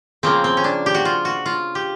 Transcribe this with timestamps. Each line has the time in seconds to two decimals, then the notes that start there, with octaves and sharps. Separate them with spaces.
0.23 C#3 F3 A#3 C4
0.44 C4
0.57 C#4
0.64 D4
0.86 G4
0.94 F#4
1.05 F4
1.25 F#4
1.46 F4
1.75 G4